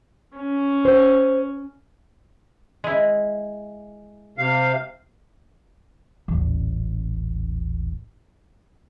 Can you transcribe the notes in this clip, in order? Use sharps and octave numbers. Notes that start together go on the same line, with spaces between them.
C#4
C5
G#3 E4
C3 F5
D#1 A1